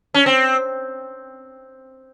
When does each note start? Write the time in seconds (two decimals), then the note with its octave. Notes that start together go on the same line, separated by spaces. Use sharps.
0.14 C#4
0.26 C4